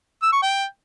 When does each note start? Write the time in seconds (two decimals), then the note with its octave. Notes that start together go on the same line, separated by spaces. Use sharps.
0.22 E6
0.32 C#6
0.42 G5